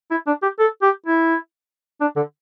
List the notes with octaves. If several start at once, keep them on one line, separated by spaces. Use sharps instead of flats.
E4
D4
G4
A4
G4
E4
D4
D3